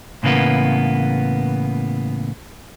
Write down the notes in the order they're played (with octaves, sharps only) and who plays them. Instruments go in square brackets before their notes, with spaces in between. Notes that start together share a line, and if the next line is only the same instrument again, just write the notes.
[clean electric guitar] A2 C#3 E3 A#3 B3